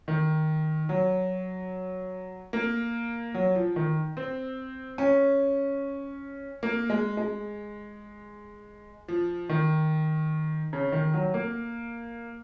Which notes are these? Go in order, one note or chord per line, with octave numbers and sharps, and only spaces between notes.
D#3
F#3
A#3
F#3
F3
D#3
C4
C#4
A#3
G#3
G#3
F3
D#3
C#3
D#3
F#3
A#3